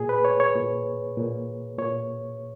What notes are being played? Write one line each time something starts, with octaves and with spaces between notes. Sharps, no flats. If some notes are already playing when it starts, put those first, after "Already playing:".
Already playing: A#2 G#4
B4
C#5
C#5
A#2
A#2
A#2 C#5